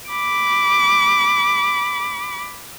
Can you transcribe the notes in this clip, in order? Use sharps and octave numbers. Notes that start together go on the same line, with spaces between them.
B5 D6